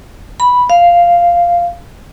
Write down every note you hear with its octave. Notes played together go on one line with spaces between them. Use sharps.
B5
F5